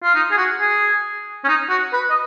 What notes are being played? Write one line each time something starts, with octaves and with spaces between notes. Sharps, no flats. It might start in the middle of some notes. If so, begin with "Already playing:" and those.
F4
D#4
G#4
F#4
G#4
C#4
D#4
F#4
B4
D#5